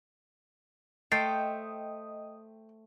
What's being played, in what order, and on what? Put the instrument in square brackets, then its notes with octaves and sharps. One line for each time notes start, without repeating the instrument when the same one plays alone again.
[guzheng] A3 C5 F5 [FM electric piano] D#5 D#6 [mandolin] G5 [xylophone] A6 C7